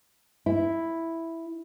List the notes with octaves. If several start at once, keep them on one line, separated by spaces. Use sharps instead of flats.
E4